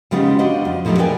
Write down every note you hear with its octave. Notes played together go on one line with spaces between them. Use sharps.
C#3 G3 G#3 B3 D#4 F4
D4 F4 F#4 C5 D#5
F2
B2 F3 F#3 A3 D#4 G4
G#4 A#4 B4 D5 G5 G#5